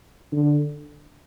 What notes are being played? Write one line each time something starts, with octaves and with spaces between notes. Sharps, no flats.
D3